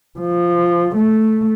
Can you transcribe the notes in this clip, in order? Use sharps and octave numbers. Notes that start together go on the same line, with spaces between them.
F3
A3